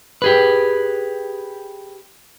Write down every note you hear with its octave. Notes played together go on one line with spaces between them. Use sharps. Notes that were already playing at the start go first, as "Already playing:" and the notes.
G4 G#4 B4